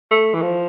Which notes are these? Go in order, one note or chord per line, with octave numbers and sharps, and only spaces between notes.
A3
E3
F3